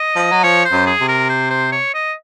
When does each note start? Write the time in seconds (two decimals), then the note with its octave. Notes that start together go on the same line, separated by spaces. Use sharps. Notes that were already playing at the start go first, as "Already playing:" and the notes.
Already playing: D#5
0.15 F3
0.32 F#3
0.43 F3 C#5
0.65 C5
0.72 F#2
0.87 G#4
1.01 C3
1.08 A#4
1.30 C5
1.50 C5
1.72 C#5
1.94 D#5